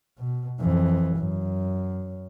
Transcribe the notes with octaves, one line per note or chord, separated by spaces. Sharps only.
B2
F2 E3
F#2